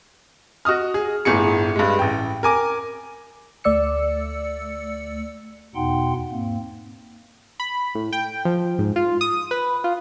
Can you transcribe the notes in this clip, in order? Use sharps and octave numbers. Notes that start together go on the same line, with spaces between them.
F#4 D#5 D#6 F6
G#4
G1 A2 G#4 C#7
G2 G#3
A1 G5
A#4 G#5 D6
D2 A3 D5 E6 C#7
E2 B2 D#4 F#5 G5 C6
G#2 A#3 C4
B5
A2
G5
F3
G#2
F4
D#6
B4
F4